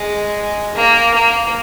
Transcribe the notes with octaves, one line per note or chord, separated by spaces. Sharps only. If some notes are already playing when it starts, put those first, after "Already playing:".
Already playing: G#3
A#3
A#3